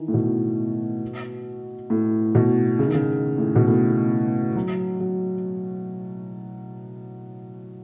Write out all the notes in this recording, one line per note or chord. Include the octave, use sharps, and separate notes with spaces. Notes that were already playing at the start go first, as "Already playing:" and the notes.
Already playing: D#3 E3
A2
B2
A2
B2
C#3
D#3
C#3
A2
B2
A2
F#3
F#3